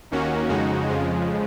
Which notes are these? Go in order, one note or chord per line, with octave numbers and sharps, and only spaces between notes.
D#2 D#3 A#3 C#4 F#4
F2 C#3 G#3 D#4 F#4
F2 C#3 F3 G#3